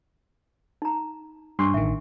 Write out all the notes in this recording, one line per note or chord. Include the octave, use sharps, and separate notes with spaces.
D#4 A#5
G2 D4 C6 C#6
A1 D#3 E5